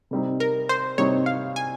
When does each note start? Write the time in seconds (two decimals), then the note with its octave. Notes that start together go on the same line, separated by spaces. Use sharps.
0.11 C3 G3 C4 D#4
0.40 A#4
0.69 C5
0.98 C3 G3 C4 D#4 C#5
1.26 F5
1.56 G#5